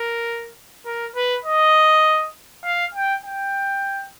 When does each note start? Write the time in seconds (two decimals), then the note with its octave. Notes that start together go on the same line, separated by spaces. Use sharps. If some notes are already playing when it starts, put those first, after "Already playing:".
Already playing: A#4
0.86 A#4
1.16 B4
1.45 D#5
2.64 F5
2.94 G5
3.23 G5